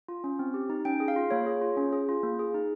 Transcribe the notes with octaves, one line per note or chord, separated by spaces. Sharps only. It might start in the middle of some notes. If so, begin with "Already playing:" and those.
F4
C#4
C4
G4
D#4
C#4 G5
G#4
F5
F4
A#3 C#5
G#4
F4
C#4
G#4
F4
A#3
G#4
D#4